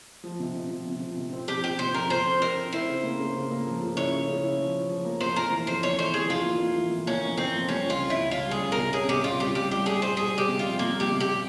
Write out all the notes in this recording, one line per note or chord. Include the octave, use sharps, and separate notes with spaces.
F3
C3
C3
F3
C3
F3
C3
C4
F3 G4
C4 G4
C3 C5
F2 A#4
F2 C5
C4
C4 A#4
C4
E4 C5
C#3
A#3
C#3
C#3
A#3
F3
C#3
E4 C#5
C#3
C#3
E4
F3
F3
F3
A#3
F2 C5
F2 A#4
E3
F2 C5
F2 C#5
E3 C5
E3 G#4
F2 F4
A#3
F2
E3
E3
A#3 C#4
F2
A#3 C4
F2
G3 C#4
C#2
F4
C#4
E4
C#2
C#4 F4
G3
G#4
C#2
A#4
C3
C#4 G#4
C3 G4
C#2 F4
G3 G4
G3 G4
G3 G4
G3 G#4
G3 C5
G3 G#4
G3 G4
C3
F2 F4
F2 A#3
G3
G4
C3
G4